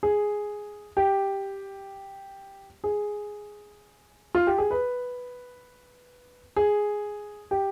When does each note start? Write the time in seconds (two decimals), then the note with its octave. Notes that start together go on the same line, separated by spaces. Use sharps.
0.03 G#4
0.97 G4
2.84 G#4
4.35 F4
4.47 G4
4.58 G#4
4.71 B4
6.56 G#4
7.51 G4